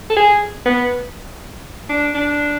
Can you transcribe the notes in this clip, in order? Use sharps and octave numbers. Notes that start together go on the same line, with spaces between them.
A4
G#4
B3
D4
D4